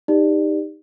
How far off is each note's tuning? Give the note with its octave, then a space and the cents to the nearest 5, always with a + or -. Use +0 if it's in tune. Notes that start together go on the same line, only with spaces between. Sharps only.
D#4 +0 G4 +25 D5 +15